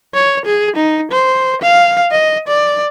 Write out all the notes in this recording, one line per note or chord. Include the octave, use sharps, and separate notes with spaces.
C#5
G#4
D#4
C5
F5
D#5
D5